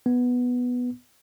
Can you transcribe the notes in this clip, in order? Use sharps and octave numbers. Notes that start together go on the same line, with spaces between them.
B3